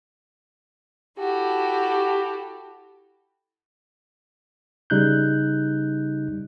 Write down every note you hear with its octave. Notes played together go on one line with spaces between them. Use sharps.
E4 F#4 G4 A4
C#3 G3 D#4 F#6 G6